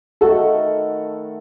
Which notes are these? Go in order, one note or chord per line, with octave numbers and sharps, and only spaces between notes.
D#3 A3 E4 F#4 A4